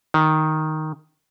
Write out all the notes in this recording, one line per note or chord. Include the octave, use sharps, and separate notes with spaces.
D#3